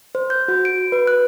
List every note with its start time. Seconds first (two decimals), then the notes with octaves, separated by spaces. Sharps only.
0.15 C5
0.30 G6
0.48 F#4
0.65 D7
0.92 B4
1.07 F#6